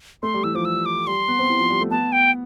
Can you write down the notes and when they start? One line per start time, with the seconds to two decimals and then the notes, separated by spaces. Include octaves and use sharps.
0.23 A3 C6
0.34 G3
0.44 E3 E6
0.55 F3 D6
0.65 E6
0.86 D6
1.07 G3 C6
1.28 B3
1.39 C4
1.50 E4
1.59 F3
1.70 G3
1.81 A3
1.91 B3 A5
2.12 G5